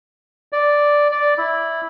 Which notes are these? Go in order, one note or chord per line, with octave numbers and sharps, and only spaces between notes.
D5
D5
E4